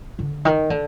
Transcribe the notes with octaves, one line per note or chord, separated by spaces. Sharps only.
D3
D#3
D3